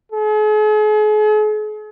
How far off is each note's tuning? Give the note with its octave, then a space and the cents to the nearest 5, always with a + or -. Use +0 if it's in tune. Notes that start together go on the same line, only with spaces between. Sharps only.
G#4 +45